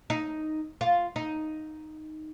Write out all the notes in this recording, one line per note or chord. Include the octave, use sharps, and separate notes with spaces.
D#4
F4
D#4